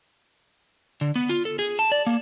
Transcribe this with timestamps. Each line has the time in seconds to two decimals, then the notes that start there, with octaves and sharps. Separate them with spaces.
1.01 D3
1.16 B3
1.29 F4
1.45 A4
1.59 G#4
1.79 A5
1.92 D5
2.07 A#3